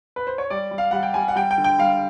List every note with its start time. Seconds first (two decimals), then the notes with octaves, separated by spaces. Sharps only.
0.16 B4
0.27 C5
0.38 C#5
0.50 G3 D5
0.71 G3
0.78 F5
0.91 G3 F#5
1.03 G5
1.14 G3 G#5
1.28 F#5
1.36 G3 G5
1.51 G5
1.58 D3
1.64 G5
1.79 G3 F5